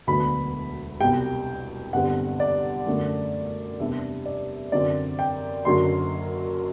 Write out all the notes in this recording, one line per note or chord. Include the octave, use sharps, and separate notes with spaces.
E1 D2 D3 F#3 B3 B5
C2 B2 G3 G5
G1 G2 D3 G3 C4 F#5
D5
F#2 D3 A3
E2 C3 G3 D4 E5
D5
F#2 D3 F#3 C4 D5
G5
F#1 F#2 D3 F#3 C6